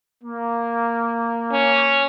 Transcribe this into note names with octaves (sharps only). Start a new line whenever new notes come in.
A#3
C#4